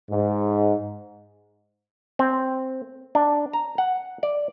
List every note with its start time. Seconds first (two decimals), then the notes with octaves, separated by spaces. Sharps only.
0.11 G#2
2.19 C4
3.15 D4
3.53 A#5
3.78 F#5
4.23 D5